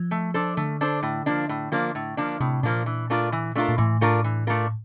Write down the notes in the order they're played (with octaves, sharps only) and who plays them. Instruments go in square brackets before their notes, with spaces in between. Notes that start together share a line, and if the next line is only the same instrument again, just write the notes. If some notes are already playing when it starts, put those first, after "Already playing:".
Already playing: [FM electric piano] F3
[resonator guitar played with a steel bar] A3
D4 A4 C5
[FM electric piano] D3 [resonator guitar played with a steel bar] A3
[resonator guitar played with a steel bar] D4 A4 C5
A2
F3 A#3 D4
A2
F3 A#3 D4
A2
F3 A#3 D4
[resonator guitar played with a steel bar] A2 [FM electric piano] C3
[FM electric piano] A#2 [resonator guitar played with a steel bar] F3 A#3 D4
[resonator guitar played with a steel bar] E3
A3 D4 F4 A#4
E3
A3 D4 F4 A#4
[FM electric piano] A#2
[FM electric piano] A2 [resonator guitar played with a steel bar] E3
[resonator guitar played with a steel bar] A3 D4 F4 A#4
E3
A3 D4 F4 A#4